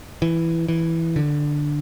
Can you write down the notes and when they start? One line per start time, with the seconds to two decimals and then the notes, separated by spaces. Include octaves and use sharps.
0.22 E3
0.68 E3
1.16 D3